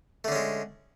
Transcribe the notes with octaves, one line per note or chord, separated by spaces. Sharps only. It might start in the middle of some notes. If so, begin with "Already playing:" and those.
D3 G#3 A3 C#4